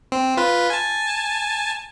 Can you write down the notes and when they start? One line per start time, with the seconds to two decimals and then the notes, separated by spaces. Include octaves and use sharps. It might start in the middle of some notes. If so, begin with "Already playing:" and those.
0.12 C4
0.37 F4 B4
0.70 G#5 A5